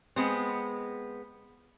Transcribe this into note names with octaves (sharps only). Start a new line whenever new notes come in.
G#3 B3 C4